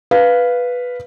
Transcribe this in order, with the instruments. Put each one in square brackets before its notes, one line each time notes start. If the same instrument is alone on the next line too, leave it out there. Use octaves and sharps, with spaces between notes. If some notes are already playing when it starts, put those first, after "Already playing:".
[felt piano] B4 F5